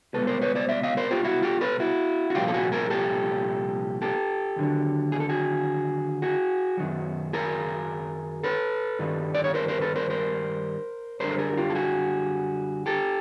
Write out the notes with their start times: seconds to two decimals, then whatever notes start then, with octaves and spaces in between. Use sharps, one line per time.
0.14 C2 B2 G#3 A4 B4
0.27 A#4 C5
0.41 B4 C#5
0.55 C5 D5
0.69 D5 E5
0.83 D#5 F5
0.97 A#4 C5
1.11 F4 G4
1.24 E4 F#4
1.42 F4 G4
1.61 A4 B4
1.80 E4 F#4
2.30 F#4
2.35 C2 A#2 F3 F4 G4
2.48 A4
2.54 F#4 G#4
2.72 G#4 A#4
2.90 G4 A4
4.02 G4 A4
4.56 D#2 D3 F#3
5.12 G#4
5.20 A4
5.29 F#4 G#4
6.22 F#4 G#4
6.77 F#2 D#3 F#3
7.33 G#4 A#4
8.44 A4 B4
8.99 G2 D#3 G3
9.35 D5
9.44 C#5
9.54 A#4 C5
9.68 A#4 C5
9.81 A4 B4
9.96 A#4 C5
10.10 A#4 C5
11.20 F#2 D3 G3 A#4 C5
11.30 A4
11.38 G#4 A#4
11.53 F#4
11.57 F4 G4
11.70 A4
11.75 F#4 G#4
12.86 G4 A4